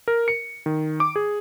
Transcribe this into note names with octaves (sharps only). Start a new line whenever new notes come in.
A#4
C#7
D#3
D6
G#4